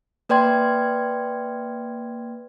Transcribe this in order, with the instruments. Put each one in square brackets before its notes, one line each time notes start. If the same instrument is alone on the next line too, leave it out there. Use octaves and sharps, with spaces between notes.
[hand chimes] A#3 B4 D5 G5 C6 G#6